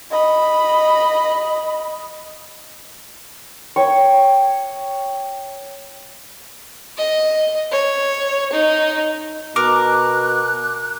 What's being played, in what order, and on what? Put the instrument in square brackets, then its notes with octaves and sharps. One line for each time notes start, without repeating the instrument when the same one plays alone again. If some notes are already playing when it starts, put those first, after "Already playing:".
[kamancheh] D#5 B5
[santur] C#5 G5 C#6
[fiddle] D#5
C#5
D#4
[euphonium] B2 [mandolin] A#4 [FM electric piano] D6 [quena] F#6